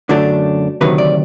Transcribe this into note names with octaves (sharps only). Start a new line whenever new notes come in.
F#2 D3 F#3 A3 D4
D2 C3 D#3 F#3 B4
D5